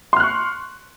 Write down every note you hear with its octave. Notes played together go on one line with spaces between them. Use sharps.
C6 C#6 F6 F#6